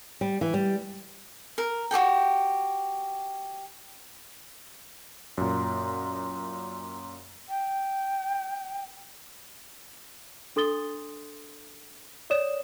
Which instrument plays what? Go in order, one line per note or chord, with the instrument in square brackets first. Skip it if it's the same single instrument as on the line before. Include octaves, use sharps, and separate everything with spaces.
[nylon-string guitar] G3
E3
G3
[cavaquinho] A#4
F#4 G4 A4 G5
[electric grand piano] F#2 A#2 [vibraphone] A#5 C6
[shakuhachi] G5
[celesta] D4 A4 C6 D#6 A6 G7
C#5 D5 D#6 E7